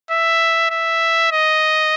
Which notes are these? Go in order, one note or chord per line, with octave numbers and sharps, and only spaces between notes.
E5
E5
D#5